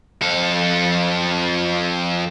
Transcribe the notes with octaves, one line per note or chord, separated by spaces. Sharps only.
F2 A4